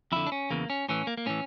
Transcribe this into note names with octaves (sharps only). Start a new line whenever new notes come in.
F2 D3 E4
D4
C#4
E2 C#3 E3 A#3
C#4
A2 E3 C#4
A#3
A#3
A2 E3 C#4